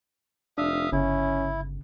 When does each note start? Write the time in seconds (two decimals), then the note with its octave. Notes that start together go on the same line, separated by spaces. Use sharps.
0.58 F1 D4 E5 F5 D#6
0.92 G1 C#3 C#4 E4